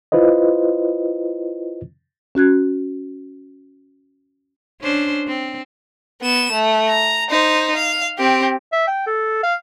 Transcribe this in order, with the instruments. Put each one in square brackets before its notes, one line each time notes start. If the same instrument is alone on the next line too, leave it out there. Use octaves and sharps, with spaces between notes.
[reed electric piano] E4 F4 B4 C5 D#5
[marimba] C#4 F#4 F#6 G#6
[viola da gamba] C#4 D4 C5
C4
[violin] B3 E7
A3
A#5
D#4 C5
F5
C4 G4
[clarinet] E5
G5
A4
F5